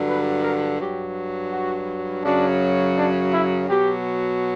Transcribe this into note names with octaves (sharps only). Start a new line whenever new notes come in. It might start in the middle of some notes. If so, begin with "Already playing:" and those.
Already playing: G2 D3 F#3
B4
A#4
G2 F#3 G4
F#4
F#2 C#3 F#3 D4
D4
E4
B2 F#3 G4